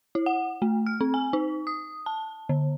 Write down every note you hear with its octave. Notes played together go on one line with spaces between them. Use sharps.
E4
F#5
A3
F6
C4
G#5
D#4
D#6
A5
D3